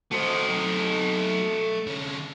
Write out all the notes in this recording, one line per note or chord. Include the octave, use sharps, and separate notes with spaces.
A3 F#4 C5 D#5
F#3 D#4
D3 C#4